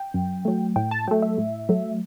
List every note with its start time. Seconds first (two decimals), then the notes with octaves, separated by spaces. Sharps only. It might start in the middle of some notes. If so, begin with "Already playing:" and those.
Already playing: G5
0.14 F#2
0.45 F#3 A3
0.76 A2 G5
0.91 A5
1.08 F#3 A3 G5
1.22 E5
1.38 A2
1.69 F#3 A3